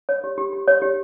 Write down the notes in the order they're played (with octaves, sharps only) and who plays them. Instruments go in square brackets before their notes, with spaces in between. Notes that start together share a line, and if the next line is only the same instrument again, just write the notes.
[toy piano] C#5
G4
G4
G4
C#5
G4